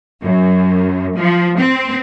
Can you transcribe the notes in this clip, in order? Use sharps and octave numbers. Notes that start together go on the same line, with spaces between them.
F#2
F3
C4